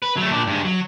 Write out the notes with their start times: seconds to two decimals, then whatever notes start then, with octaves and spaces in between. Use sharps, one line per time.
0.02 B4
0.17 F#3 A3
0.31 A#2 D4
0.47 G2 G#3
0.65 F#3